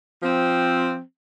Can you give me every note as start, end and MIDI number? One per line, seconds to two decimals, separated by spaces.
0.22 0.99 53
0.22 0.99 60